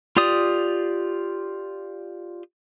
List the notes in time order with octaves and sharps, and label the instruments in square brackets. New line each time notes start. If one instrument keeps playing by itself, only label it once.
[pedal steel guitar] F4 G4 D5 D#6